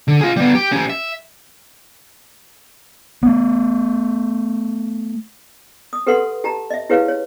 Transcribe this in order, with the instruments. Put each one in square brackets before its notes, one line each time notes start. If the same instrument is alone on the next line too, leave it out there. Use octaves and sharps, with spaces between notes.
[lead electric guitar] D3
F4 G#4
G3 B3
G4
C#4 G4
E5
[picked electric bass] A3 B3
[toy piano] D#6
G4 A4 B4 E5 F#5 C6
G4 A5 A#5
D#5 E5
E4 G4 G#4 B4 C#5 F5
C#5